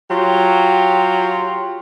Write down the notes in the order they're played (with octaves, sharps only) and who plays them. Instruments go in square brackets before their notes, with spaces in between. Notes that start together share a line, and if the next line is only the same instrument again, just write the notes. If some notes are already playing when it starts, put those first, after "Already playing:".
[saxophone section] F#3 F4 G4